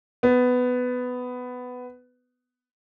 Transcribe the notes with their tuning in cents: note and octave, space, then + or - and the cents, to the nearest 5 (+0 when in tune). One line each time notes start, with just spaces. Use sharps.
B3 +10